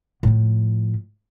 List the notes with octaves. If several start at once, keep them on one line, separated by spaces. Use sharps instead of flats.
A2 F3